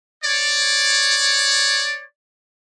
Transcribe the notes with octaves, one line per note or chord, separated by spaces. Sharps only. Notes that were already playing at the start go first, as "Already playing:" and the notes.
C#5 D5